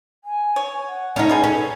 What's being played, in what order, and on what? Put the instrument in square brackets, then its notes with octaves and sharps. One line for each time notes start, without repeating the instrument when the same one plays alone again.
[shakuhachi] G#5
[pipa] C#5
[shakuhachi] F#5
[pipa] D3 D#3 A3 [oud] C#4 D#4
[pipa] B2 G#4 G#5
[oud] C#4 [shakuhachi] A4